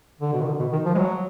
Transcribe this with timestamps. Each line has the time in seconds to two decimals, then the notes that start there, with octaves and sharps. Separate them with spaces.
0.21 D3
0.33 B2
0.41 D#3
0.46 D3
0.59 B2
0.72 D#3
0.85 F3
0.95 G#3
0.98 F#3